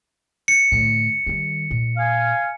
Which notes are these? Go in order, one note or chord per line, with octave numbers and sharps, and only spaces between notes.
C#7
A2 D3
D#3 G3
A#2
F5 G#5